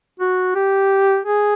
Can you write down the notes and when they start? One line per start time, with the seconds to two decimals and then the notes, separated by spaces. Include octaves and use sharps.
0.20 F#4
0.55 G4
1.25 G#4